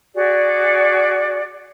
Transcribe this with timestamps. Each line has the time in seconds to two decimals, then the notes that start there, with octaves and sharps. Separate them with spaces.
0.14 F#4 G#4 D5